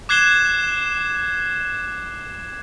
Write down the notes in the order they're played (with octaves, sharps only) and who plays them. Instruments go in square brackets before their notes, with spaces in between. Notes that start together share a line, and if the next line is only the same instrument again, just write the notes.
[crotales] D6 F#6 G#6 C7 E7 G7